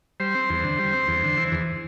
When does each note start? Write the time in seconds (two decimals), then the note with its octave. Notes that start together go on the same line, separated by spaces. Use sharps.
0.20 G3 C5
0.35 C4
0.50 E2
0.64 D3
0.79 G3
0.93 C4
1.08 E2
1.23 D3
1.37 E3
1.52 E2